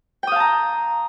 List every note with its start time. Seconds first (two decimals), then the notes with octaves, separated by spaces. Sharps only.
0.23 G5
0.27 D#6
0.32 F5
0.36 A5
0.40 A#5